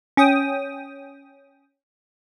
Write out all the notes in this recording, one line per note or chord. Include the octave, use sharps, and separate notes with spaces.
C#4 G5 D#6